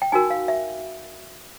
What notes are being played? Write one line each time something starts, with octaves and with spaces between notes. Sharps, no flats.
G5
D#4 F#4 A#4 G#5
F5
E5